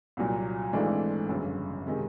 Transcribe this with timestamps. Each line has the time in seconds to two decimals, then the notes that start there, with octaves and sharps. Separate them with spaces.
0.17 C2 A#2 F#3
0.73 G#1 G#2 E3 A3 D4
1.29 G1 F#2 C#3
1.87 C3 D#3 G#3